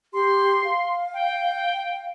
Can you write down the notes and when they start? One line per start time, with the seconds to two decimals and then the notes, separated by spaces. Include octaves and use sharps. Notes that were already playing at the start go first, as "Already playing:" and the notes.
0.13 G4 C6
0.64 F5
1.14 G5